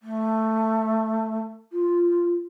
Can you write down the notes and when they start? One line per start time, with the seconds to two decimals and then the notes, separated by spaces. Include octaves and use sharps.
0.01 A3
1.72 F4